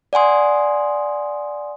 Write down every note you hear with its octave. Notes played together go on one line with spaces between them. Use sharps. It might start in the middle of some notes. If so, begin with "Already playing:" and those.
D5 F#5 G#5 C6 D#6